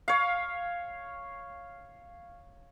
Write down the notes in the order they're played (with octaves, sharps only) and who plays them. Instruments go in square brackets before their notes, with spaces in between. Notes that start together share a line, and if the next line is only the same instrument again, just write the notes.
[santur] C#5 F5